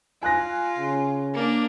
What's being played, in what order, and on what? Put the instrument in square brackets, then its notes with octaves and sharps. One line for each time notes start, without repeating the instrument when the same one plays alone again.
[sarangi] F4 [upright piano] G#5 F#6 A#6
[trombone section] C#3
[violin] A#3 D4